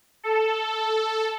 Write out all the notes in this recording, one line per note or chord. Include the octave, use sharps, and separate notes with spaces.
A4